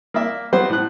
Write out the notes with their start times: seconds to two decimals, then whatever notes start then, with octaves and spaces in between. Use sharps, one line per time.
0.14 A#3 D5 E5
0.52 F#3 B3 F#4 G4 C5
0.69 A2 F#6